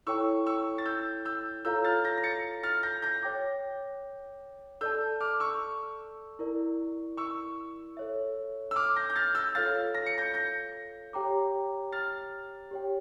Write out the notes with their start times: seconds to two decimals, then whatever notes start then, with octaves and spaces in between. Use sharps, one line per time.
0.07 E4 A4 C#5 G5 C#6 E6
0.46 C#6 E6
0.78 A6
0.85 E6 G6
1.25 E6 G6
1.65 F4 A4 C#5 F5 A#5 E6 G6
1.84 F6 A6
2.04 G6 A#6
2.18 A#6
2.24 A6 C#7
2.63 F6 A6
2.83 G6 A#6
3.02 G6 A#6
3.23 C#5 G5 D6
4.81 A4 D5 A5 E6 G6
5.21 D6 F6
5.40 C#6 E6
6.39 E4 A#4 D5
7.17 C#6 E6
7.97 A4 C#5 E5
8.71 E6
8.76 D6 F6
8.96 G6 A#6
9.10 G6
9.16 F6 A6
9.35 E6 G6
9.55 F4 A4 C#5 F5 F6 A6
9.95 A#6
10.06 C#7
10.18 G6 A#6
10.34 G6 A#6
11.13 G4 C#5 G5 A#5 D6
11.92 F6 A6
12.71 G4 C#5 G5